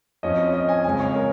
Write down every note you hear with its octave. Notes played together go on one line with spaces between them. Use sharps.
F2 F3 C#4 D#5
D#5
G#5
F2 C#3 G#3 C#4 G#5
C#5
A#4